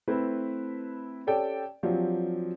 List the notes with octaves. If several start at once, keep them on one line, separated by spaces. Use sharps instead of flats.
A3 C4 E4 B4
C#4 G4 A4 D5 G5
F3 F#3 C4 D4 F4 G4